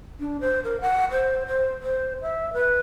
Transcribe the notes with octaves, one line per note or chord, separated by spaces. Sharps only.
D4
C5
A#4
F#5
C5
C5
C5
E5
B4